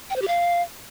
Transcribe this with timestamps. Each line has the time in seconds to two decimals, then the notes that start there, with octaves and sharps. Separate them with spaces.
0.10 G5
0.16 C5
0.22 G4
0.28 F5